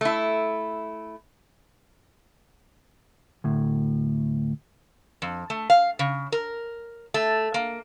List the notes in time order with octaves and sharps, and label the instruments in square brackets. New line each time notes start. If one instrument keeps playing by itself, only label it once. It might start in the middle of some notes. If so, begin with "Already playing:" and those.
[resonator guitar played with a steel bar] A3 E4
[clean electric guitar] D2 A2
[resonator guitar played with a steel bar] F2
A3
F5
C#3
A#4
A3
A#3